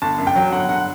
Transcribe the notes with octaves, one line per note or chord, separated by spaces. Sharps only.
G1 A5
F#2
G5
F#3
G1 F#5
G1 F#5